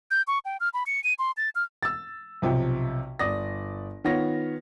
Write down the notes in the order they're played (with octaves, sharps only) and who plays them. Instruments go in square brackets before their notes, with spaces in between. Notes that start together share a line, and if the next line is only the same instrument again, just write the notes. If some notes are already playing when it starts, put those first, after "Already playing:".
[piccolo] G6
C#6
G5
F6
B5
C#7
D#7
C6
A6
F6
[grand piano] E6 A6
B1 C3 F3 G5
G1 D5 D#6 A#6
D#3 B3 F4 C#5 A#6